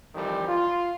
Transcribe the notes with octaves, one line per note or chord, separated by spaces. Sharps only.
F2 D#3 E3 G3
F4